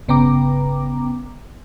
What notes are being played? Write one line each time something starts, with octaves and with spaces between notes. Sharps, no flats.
G1 C#3 B3 G5 A#5 D6